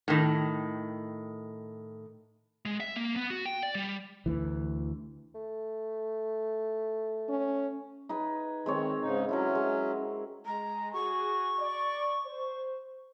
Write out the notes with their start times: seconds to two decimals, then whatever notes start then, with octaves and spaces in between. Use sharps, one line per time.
0.08 A2 D#3
2.65 G#3
2.80 E5
2.96 A#3
3.16 B3
3.30 F#4
3.46 G5
3.63 D5
3.75 G3
4.26 D2 E3
5.35 A3
7.29 C#4
8.09 D#4 G#4 B4
8.66 D#3 G#3 C4 C#5
9.01 G#2 C#3 D#4
9.29 F#3 C#4 E4 A4 A#4
9.55 G#3
10.46 G#3 A#5
10.93 F#4 G#4 C#6
11.59 D5
12.25 C5